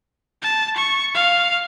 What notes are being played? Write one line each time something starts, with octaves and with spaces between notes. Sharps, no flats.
A5
C#6
F5